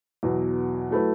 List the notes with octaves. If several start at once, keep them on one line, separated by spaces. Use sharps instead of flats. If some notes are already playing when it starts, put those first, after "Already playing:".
E2 B2 F#3
F#3 A3 E4 B4